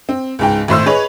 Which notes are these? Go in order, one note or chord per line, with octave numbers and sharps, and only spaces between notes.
C4
C#2 G#2 G5
G#1 A2 C5 E6
G#4 B4 C#5 D#5